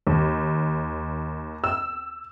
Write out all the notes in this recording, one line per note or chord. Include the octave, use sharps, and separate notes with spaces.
D#2
E6